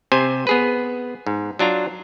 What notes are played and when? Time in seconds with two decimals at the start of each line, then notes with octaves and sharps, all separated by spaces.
0.12 C3 C4 C5 G#5
0.47 B3 G#4 B4
1.27 G#2
1.59 F#3 D4 F4 A#5